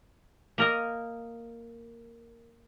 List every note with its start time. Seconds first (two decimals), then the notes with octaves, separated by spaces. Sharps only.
0.58 A#3 A#4 D#5